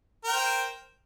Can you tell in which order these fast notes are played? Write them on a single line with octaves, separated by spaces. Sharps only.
A#4 G5 C5